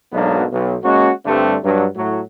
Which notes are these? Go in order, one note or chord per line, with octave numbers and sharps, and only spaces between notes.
B1 G#2 F#3 A#3 B3 D4
B1
G#3 A#3 C#4 F#4
G2 D3 G3 A3 C4
G2 F#3
A2 F#3